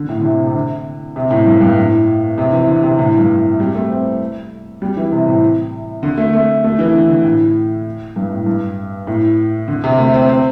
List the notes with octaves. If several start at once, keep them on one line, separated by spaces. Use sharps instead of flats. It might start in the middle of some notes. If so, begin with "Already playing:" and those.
Already playing: D3
A2
D3
C3
C3
D3
C3
A2
G2
G2
A2
C3
E3
D3
C3
A2
G2
A2
G3
A3
C4
G3
E3
C3
A2
D3
A3
A3
A3
E3
D3
D3
A2
G2
A2
G2
A2
D3
C3
A3
C4
C4